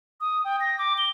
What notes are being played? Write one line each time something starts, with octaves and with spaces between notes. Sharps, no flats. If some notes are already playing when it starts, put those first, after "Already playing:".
D#6
G5
A#6
D6
G7